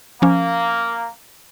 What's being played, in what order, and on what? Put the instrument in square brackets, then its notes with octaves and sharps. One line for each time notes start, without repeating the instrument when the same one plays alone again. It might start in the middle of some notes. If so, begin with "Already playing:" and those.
[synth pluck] F3 C#4 [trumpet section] A#3